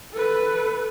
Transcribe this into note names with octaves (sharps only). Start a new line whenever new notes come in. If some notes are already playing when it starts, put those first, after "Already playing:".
A4 B4